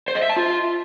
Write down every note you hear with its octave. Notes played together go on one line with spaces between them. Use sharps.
C5
D#5
E5
A5
F4